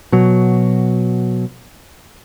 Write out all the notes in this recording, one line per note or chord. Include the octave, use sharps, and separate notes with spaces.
B2 F#3